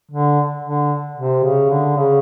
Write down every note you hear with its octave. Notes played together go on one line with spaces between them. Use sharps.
D3
D3
C3
C#3
D3
C#3